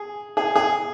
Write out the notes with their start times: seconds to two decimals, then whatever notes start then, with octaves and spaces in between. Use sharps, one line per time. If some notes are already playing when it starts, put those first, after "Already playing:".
Already playing: G#4
0.37 G#4
0.56 G#4